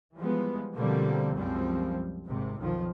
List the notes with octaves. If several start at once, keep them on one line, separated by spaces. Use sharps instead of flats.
E3 F3 G3 G#3 B3
B2 D3 F3 G3 A#3 C4
C2 F#2 F3 G3 G#3 C4
G#1 G#2 C3
B1 F2 D#3 F3